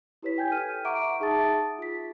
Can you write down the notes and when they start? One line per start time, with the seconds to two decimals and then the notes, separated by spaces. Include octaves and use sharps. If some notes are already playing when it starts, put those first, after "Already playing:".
0.22 E4 G4 B4 C#5 B6
0.38 G5 G#5 G6 G#6
0.51 A4 F6 D#7
0.85 E5 F#5 A#5 C#6 D6 D7
1.20 D#4 G#4 E5 A5 D#6 A6
1.78 F4 B6